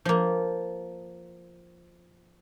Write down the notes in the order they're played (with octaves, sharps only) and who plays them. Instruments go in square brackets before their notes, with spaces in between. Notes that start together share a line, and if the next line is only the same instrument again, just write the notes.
[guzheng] F3 A#3